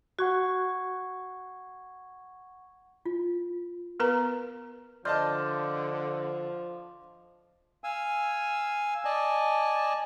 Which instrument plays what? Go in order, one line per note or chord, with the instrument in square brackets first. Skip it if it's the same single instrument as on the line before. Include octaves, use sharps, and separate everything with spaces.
[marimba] F#4 [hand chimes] F#5 C#6 G#6
[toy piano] F4
[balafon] B3 A#4 B4 A#5
[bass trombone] D3 [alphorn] F3 [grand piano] D5 D#5 A5 [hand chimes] C6 F6 G6
[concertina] F5 G#5 E6
D5 D#5 G#5 A5